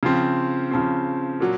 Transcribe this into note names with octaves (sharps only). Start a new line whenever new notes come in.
C#3 F3 C4
C#3 F3 C4
A#2 F#3